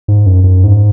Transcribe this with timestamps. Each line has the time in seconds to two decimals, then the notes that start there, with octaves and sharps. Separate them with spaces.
0.08 G#2
0.26 F#2
0.44 F#2
0.63 G#2